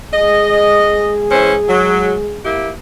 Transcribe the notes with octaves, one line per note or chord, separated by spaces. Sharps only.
G#3 G#4 D#5
E3 C#4 C5
F#3
A#3 E4 G4